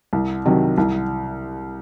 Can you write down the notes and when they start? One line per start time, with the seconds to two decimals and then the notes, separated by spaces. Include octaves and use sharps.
0.13 C2
0.45 C3 D#3 F#3
0.78 C2